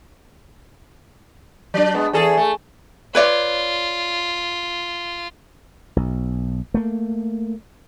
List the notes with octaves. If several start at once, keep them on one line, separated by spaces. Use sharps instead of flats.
F#3 D4
G#3 B3
E2 G#4 A4
A3
F4 B4 C#5 D5
B1
A3 A#3